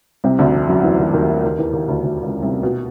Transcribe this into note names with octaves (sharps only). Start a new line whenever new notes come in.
C2 C3
D2 D3
F2 F3
F#2 F#3
E2 E3
D#2 D#3
D#2 D#3
D#2 D#3
E2 E3
D#2 D#3
D2 D3
D2 D3
C#2 C#3
C2 C3
B2